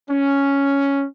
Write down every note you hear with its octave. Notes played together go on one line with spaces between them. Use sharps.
C#4